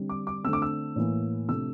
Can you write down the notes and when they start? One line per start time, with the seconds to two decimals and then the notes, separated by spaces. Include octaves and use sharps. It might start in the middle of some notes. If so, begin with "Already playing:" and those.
Already playing: D3 G3 C4
0.09 D6
0.27 D6
0.44 D3 A3 C4 E6
0.53 D6
0.62 E6
0.96 A2 E3 A#3
1.49 C3 F3 A3 D4 E6